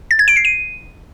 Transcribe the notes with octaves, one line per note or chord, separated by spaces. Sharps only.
A6
G#6
D7
C7
D#7